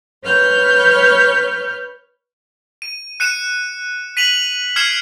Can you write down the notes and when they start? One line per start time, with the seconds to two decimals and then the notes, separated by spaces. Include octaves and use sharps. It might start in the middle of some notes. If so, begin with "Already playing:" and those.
0.24 B4 C#5 F6 G6
2.82 D#7
3.20 F#6 C#7 D#7 E7
4.17 B6 D#7 F7 F#7
4.76 F6 G#6 C7 C#7 E7